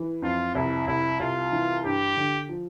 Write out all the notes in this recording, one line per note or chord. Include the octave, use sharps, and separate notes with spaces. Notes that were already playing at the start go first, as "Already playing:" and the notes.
Already playing: E3
F2 F4
C2 E4
C2 E4
C2 F4
E3
G2 G4
D3
F3